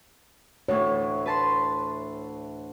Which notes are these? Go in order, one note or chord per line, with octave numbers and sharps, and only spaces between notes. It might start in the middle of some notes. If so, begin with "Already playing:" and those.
D2 A2 E3 C#5
B4 A5 C6